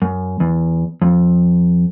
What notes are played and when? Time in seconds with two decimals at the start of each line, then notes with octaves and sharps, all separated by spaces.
0.02 F#2
0.40 E2
1.02 F2